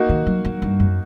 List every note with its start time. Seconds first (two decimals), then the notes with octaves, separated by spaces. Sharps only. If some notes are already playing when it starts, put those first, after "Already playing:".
Already playing: A#3 D#4 F#4
0.09 D#3
0.27 F#3
0.45 F#3
0.62 G2
0.80 F#2